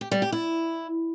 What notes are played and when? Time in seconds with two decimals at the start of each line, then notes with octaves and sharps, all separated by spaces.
0.01 G4
0.11 G3
0.22 G4
0.32 E4